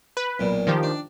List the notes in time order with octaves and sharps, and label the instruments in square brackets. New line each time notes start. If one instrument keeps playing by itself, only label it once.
[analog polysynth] B4
[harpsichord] B1 A#2
[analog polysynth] D#3 F3 G4
[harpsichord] D4